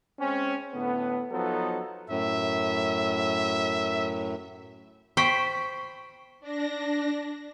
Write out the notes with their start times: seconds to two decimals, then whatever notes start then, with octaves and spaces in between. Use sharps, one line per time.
0.19 G#3 C4 C#4
0.74 A2 D3 B3
1.32 F3 F#3 B3 D#4 A4
2.10 F#2 A2 E5
5.17 C5 G5 B5 C#6 B6
6.41 D4 A#6